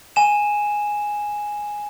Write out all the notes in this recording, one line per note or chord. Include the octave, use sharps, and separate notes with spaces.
G#5 E7